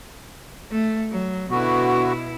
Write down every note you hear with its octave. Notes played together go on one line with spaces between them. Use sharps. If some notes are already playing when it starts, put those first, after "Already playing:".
A3
F#3
B2 D3 B3 E4 F#4